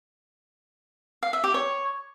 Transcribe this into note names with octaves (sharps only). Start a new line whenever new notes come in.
F5
E5
G4
C#5